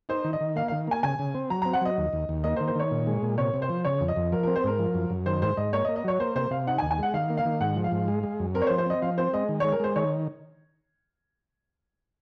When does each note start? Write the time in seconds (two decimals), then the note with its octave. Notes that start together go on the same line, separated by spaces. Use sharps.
0.09 D#4 C5
0.24 D#3
0.33 D#5
0.41 D#3
0.56 A#3 F5
0.68 F5
0.72 D#3
0.87 A#3 G#5
1.03 C#3 G#5
1.19 C#3
1.35 C4
1.50 F#3 A#5
1.62 A#5
1.65 C4
1.73 F#5
1.81 F#3 D#5
1.98 D#2
2.13 D#2
2.29 D#2
2.44 A#3 D#5
2.56 C5
2.60 D#3
2.67 C5
2.75 D#3 C#5
2.91 A#2
3.07 G#3
3.22 A#2
3.38 C3 C#5
3.54 C3
3.62 C5
3.69 F3
3.85 C#3 C#5
4.01 F2
4.08 D#5
4.16 F2
4.32 F3 A#4
4.43 A#4
4.47 C4
4.56 C5
4.64 G#2 A#4
4.79 F3
4.95 F#2
5.10 F#2
5.26 D#3 C5
5.42 G#2 C5
5.57 G#2 D#5
5.73 A#3 C#5
5.85 D#5
5.89 A#3
5.96 D#5
6.04 F#3 C#5
6.20 A#3 C5
6.36 C3 C5
6.51 C3 F5
6.67 D#4 F#5
6.78 G#5
6.82 D#2
6.91 G#5
6.98 G#3 F#5
7.14 D#3 F5
7.30 A#3
7.37 F5
7.45 D#3
7.60 G#2 F#5
7.76 F3
7.84 F5
7.92 G#2
8.08 G#3
8.23 G#3
8.40 F#2
8.55 C4 A#4
8.62 C#5
8.67 C5
8.70 F3
8.78 C5
8.86 C4 D#5
9.02 F3 F5
9.18 C4 C5
9.33 G#3 D#5
9.49 D#3
9.60 C#5
9.64 G#3
9.72 A#4
9.80 G#3 C5
9.96 D#3 C#5